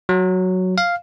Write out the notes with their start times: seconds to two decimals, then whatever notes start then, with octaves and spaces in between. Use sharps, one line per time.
0.09 F#3
0.78 F5